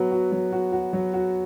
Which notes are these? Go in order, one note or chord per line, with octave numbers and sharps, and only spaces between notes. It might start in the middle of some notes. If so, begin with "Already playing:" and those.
Already playing: F#3 B3 F#4
F#4
F#3
F#4
F#4
F#3
F#4